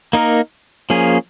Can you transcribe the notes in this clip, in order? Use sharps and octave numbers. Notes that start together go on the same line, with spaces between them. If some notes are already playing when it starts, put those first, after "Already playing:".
A#3 D#4 A#4
F3 A#3 C#4 G#4